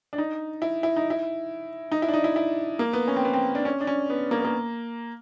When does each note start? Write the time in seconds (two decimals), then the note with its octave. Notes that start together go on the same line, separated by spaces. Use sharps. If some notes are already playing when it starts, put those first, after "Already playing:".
0.13 D4
0.18 D#4
0.62 E4
0.83 E4
0.96 D#4
1.10 E4
1.92 D#4
2.02 E4
2.09 D4
2.14 D#4
2.24 E4
2.36 E4
2.79 A#3
2.93 B3
3.08 C#4
3.16 C4
3.25 B3
3.33 C4
3.55 D4
3.65 C#4
3.81 D4
3.87 C#4
4.10 B3
4.31 A#3
4.38 B3
4.45 A#3